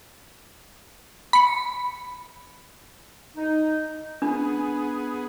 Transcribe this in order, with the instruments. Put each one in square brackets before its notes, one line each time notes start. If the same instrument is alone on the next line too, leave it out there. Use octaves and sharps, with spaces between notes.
[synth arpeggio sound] B5 C#7
[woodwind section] D#4
[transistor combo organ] B3 G#4 [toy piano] D4